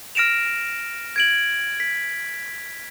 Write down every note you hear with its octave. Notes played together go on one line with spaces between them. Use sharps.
F6 A#6 D7 E7 F7
G#6 D7 F#7
B6